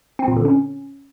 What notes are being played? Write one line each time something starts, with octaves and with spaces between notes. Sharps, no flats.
C4
A#2
D3
C#4